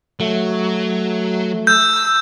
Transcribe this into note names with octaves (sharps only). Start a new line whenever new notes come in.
F#3 A3
E6 G6